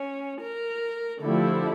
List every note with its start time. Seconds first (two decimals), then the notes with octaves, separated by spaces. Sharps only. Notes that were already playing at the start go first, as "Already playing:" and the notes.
Already playing: C#4
0.42 A#4
1.21 D3 F3 A3 E4 G4 A4